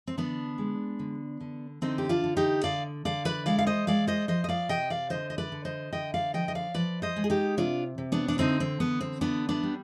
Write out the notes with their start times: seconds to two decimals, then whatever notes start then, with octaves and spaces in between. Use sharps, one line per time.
0.07 C4
0.17 D3 B3 D4
0.58 G#3
0.99 D3
1.40 D3
1.82 D3 C4 D#4
1.98 G4
2.09 D4 F4
2.24 D3
2.37 D#4 G4
2.64 D3 D5 F5
3.05 D3 D5 F5
3.25 B4 D5
3.46 G#3 D5 F5
3.58 F5
3.67 C5 D#5
3.87 G#3 D5 F5
4.07 C5 D#5
4.28 F3 C5 D#5
4.44 D#5
4.49 D5 F5
4.69 C3 D#5 G5
4.90 D5 F5
5.10 D3 C5 D#5
5.30 D#5
5.38 B4 D5
5.52 D3
5.65 C5 D#5
5.93 D3 D#5 G5
6.14 D5 F5
6.34 F3 D#5 G5
6.48 D#5
6.55 D5 F5
6.74 F3 B4 D5
7.02 C5 D#5
7.16 G#3
7.24 G#4
7.30 D#4 G4
7.57 C3 D4 F4
7.98 C3
8.12 B3 D4
8.28 D4
8.39 D3 C4 D#4
8.60 C4
8.80 D3 B3
9.01 C4
9.21 D3 B3 D4
9.49 B3 D4
9.63 G3